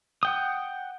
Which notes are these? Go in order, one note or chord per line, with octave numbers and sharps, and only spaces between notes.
F#5 G5 D#6